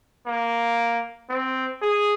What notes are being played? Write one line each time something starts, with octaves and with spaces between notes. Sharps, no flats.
A#3
C4
G#4